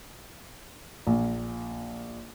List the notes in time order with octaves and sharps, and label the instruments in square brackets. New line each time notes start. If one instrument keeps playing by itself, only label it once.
[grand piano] A#1